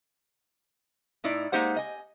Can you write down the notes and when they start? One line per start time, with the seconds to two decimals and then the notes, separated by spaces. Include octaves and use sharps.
1.24 A2 D#4 E4 D5
1.52 G#3 A#3 D#4 G4 C5 F#5
1.76 D#5 G#5